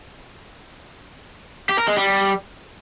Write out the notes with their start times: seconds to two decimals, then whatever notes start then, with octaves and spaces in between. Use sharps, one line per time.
1.69 G4
1.78 A#4
1.88 G#3
1.97 G3